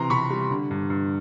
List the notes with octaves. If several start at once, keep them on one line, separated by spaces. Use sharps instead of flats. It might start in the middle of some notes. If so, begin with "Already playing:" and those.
Already playing: C3 E3 A#5 C6
C3 B5 C#6
G3
D3
G2
G2